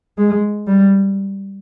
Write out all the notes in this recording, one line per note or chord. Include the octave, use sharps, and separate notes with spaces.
G#3
G3